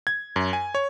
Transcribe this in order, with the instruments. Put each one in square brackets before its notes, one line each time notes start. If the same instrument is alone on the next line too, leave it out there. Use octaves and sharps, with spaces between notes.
[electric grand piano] G#6
F#2
G#5
C#5